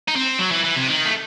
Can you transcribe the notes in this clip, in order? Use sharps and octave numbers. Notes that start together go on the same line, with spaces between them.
D#4
C4
F#3
E3
E3
C3
D#3
A3